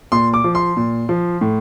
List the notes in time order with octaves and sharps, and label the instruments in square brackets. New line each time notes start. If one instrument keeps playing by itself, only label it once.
[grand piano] A#2 C6
D6
F3
C6
A#2
F3
A2